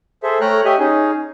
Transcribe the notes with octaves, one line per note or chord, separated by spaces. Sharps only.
G#4 A4 C5 E5
A3 C#5 G5 A#5 F6 F#6
G4 C#5 D#5 E5 G#5
C#4 D#4 G#4